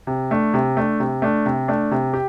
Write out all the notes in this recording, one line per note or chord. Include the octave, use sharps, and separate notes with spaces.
C3
A3 D4
C3
A3 D4
C3
A3 D4
C3
A3 D4
C3
G4